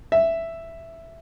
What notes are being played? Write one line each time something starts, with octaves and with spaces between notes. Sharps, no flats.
E5